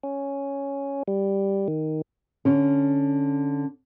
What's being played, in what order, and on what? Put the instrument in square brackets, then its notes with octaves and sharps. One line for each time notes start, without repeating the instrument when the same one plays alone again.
[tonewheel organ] C#4
G3
D#3
[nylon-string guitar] D3 C#4